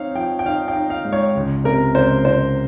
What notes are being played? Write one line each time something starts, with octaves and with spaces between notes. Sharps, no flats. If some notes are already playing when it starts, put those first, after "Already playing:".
Already playing: C4 D#4 C#5 F5
F3 G5
G5
D#4 F5
G5
D#4
F5
G#2
C#5
C#2
C3 A#4
C#2 C5
C3 C5